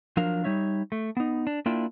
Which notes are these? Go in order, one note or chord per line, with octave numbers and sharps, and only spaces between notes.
F3 F#3 D4 A#4 F5
G3 D#4 C#5 E5
A3
B3 D#4
D4
A#3 D4 E4 F4 G5